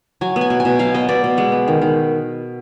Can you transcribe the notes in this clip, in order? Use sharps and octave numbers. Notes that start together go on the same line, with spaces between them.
F#3 G#5
B3
G#5
B2
G#5
B2
F#3 F5
B3 D#5
B2 D5
B2
G#3 F#5
B3
D#3
D#3